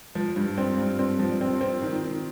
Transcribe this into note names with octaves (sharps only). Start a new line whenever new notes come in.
F3
G2
C4
G2
C4
F3
C4
C4
D#3
D#3